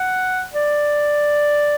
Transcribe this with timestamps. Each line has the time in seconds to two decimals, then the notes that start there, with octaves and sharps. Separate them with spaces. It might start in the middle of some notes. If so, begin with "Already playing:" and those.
Already playing: F#5
0.54 D5